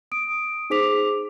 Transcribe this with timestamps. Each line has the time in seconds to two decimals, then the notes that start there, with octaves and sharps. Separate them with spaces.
0.12 D#6 D7
0.70 D#4 G#4 C5 D6 B6 F7